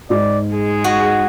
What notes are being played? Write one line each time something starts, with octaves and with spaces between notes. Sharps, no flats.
G#2 D5
G#3 G#4
F#4